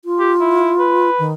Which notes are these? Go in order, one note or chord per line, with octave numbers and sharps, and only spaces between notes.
F4
G4
E4
B4
D#3